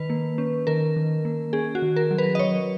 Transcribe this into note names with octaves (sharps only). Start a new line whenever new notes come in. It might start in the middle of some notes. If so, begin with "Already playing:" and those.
Already playing: D#3 B4
A#3
C#4
D#3 A#4
D#3
A#3
C#4 G#4
F#4
D#3
A#4
F#3
B4
D#5
F#3 C#5